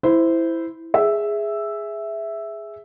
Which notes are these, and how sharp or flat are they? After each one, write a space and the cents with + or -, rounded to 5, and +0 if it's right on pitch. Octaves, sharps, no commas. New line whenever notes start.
E4 +0 C5 -15
G#4 +0 E5 +0